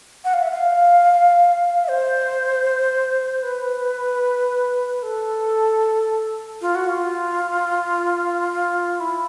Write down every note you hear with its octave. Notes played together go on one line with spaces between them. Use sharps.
F#5
F5
E5
F5
E5
C5
B4
A4
F4
F#4
F4
E4